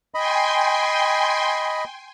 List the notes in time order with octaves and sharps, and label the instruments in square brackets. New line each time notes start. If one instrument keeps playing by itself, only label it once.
[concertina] D#5 B5 [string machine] G5 G#5 C6